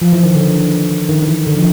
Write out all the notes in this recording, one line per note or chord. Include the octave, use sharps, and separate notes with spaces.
F3
E3
D#3
D3
D#3
D#3
E3
D3
F3